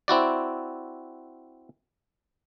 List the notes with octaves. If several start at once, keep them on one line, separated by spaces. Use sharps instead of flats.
C4 E4 F#4 D5